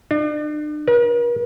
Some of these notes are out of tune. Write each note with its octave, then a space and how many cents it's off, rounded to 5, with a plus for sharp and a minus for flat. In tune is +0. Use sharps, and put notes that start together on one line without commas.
D4 +40
A#4 +45